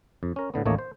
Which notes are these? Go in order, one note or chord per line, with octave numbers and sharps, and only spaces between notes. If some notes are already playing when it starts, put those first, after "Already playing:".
F2
C#4 A#4
A2 D3 B3
A1 D#2 A3 A#3 C#5 D#5
C5